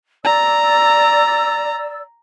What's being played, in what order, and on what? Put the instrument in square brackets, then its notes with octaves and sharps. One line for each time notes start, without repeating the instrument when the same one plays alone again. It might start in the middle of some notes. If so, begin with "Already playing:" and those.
[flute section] D5 E6 [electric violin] A#5